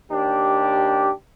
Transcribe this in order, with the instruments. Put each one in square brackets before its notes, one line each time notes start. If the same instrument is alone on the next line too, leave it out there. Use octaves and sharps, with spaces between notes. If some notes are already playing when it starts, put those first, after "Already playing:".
[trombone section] D#2 D4 G4